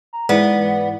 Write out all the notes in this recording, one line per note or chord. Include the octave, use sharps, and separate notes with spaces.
A#5
G#2 E3 B3 D5